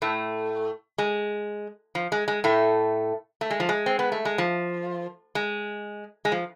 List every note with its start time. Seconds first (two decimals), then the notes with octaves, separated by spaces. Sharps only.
0.02 A2 A3
0.98 G#3
1.95 F3
2.12 G#3
2.28 G#3
2.44 A2 A3
3.41 A3
3.51 G#3
3.60 F3
3.69 G#3
3.86 C4
3.99 B3
4.12 A3
4.25 G#3
4.38 F3
5.35 G#3
6.25 G#3
6.32 F3